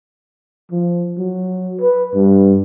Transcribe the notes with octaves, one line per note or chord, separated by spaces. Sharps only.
F3
F#3
B4
G2